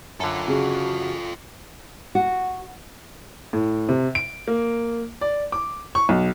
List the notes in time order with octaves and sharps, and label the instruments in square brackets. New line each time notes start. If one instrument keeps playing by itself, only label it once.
[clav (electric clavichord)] F#2 D3 [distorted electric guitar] F4 A4
[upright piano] C#3 [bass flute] F#4
[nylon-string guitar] F#4
[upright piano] A2
C3
D7
A#3
D5
D6
C#6
B1